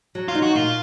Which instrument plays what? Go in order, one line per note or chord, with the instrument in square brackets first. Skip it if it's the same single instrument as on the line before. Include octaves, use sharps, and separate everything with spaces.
[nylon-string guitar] F#3
[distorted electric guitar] F4
[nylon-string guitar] D#4
[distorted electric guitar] F#4
[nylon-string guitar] A#2 [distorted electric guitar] F4